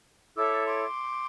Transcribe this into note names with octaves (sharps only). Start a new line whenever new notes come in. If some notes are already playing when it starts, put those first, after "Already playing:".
E4 A4 C#5 D6 E6
C6 D6